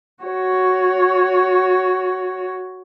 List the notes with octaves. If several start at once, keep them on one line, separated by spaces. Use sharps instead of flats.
F#4 C#5